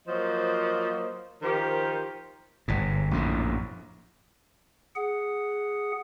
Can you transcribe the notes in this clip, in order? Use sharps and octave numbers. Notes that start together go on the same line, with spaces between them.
F3 F#3 A#3 C5 D#5
D#3 F3 G4 A#4 C5
G1 G#2
A#1 F#2 A2
G#4 F#5